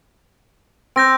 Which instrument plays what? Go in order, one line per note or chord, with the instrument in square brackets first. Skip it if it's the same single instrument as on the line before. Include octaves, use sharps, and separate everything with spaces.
[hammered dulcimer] C4 [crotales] G6 A#6 D7